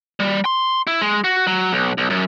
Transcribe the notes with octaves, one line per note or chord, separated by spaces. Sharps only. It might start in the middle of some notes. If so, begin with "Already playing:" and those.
G3
C6
E4
G#3
F#4
F#3
B1
B1
F#2